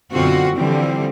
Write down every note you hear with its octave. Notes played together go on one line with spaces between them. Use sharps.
F#2 B2 D3 C4 F4 F#4
D3 E3 F3 G3 C4